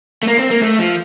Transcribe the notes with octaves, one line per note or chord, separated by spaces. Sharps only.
A3
A#3
C4
A#3
A3
F3